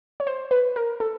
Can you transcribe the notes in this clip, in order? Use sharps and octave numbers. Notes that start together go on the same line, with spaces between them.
C#5
C5
B4
A#4
A4